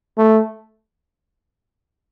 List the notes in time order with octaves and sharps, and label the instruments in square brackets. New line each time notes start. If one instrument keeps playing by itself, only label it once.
[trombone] A3